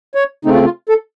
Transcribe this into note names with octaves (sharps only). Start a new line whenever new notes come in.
C#5
C#3 A3 C4 D#4
F4
F4
A4